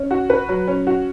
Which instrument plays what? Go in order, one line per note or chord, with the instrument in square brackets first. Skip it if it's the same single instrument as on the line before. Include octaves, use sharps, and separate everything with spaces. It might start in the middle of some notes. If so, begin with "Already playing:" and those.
Already playing: [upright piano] C#4
F#4
B4
F#3
C#4
F#4